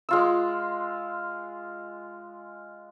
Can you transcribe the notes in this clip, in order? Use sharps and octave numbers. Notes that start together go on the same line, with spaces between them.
G#3 F4 E6